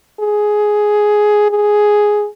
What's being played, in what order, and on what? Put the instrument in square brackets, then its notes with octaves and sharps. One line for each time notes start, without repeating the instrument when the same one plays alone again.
[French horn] G#4
G#4